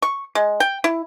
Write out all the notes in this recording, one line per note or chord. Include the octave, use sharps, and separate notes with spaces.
C#6
G#3
G5
E4